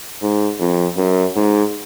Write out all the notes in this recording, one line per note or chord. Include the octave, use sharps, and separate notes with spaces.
G#2
F2
F#2
G#2